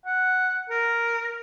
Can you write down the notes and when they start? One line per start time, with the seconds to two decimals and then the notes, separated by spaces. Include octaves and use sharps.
0.06 F#5
0.70 A#4